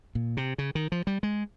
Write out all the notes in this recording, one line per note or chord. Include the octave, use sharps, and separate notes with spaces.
A#2
C3
C#3
D#3
F3
G3
G#3